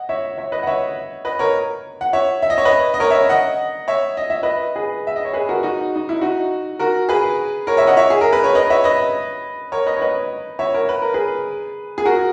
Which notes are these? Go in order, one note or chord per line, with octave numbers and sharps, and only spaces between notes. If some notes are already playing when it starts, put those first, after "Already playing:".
Already playing: D#5 F#5
C#5 E5
C#5 E5
B4 D#5
F#5
C#5 E5
B4 D#5
A#4 C#5
F#5
C#5 E5
E5
D#5
C#5
B4 D#5
D#5
A#4 C#5
C#5 E5
D#5 F#5
C#5 E5
D#5
E5
B4 D#5
G#4 B4
E5
D#5
C#5
G#4 B4
F#4 A#4
D#4 F#4
D#4
E4
D#4 F#4
F#4 A#4
G#4 B4
A#4 C#5
C#5 E5
D#5 F#5
C#5 E5
G#4
A#4
B4
C#5
B4 D#5
C#5 E5
B4 D#5
A#4 C#5
B4 D#5
C#5
B4 D#5
C#5 E5
A#4 C#5
B4
A#4
G#4 B4
G#4
F#4 A#4